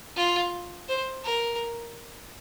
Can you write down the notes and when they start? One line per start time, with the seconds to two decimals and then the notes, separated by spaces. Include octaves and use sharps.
0.16 F4
0.89 C5
1.24 A#4